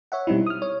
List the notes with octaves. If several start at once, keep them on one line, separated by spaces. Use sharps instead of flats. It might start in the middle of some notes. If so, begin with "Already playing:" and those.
C#5 E5 F#5
B2 G3 C4 D#4 E4
D#6 F6
C#5